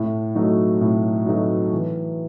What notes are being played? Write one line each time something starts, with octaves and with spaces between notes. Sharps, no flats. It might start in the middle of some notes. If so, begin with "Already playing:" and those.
Already playing: A2
F#3 A3 D#4 F#4
A2
F#3 A3 D#4 F#4
E3